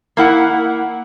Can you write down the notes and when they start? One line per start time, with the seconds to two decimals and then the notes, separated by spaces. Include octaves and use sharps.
0.17 A#3 E4 F#5